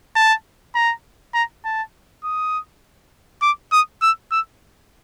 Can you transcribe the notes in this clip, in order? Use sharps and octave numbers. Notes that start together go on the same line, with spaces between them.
A5
A#5
A#5
A5
D#6
D6
D#6
E6
E6